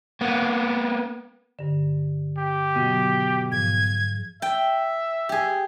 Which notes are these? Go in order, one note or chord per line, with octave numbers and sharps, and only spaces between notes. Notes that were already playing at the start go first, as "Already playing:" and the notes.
A#3 B3
G2 D3
G4
B2 D#3 F#3
G#2 F3 G#6
E5 G5
G4 G#4